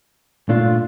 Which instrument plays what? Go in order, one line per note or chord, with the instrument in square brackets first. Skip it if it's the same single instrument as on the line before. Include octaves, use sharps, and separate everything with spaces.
[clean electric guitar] A#2 A3 D4 F4